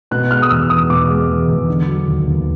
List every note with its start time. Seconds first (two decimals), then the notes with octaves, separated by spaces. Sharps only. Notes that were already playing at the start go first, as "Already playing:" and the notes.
0.11 B2 F#6
0.31 G#3 F6
0.42 D#6
0.50 E2 E6
0.70 E2 D#6
0.89 B2 D6
1.09 G#3
1.28 E2
1.48 E2
1.68 D3
1.88 F#3
2.08 D#2
2.27 D#2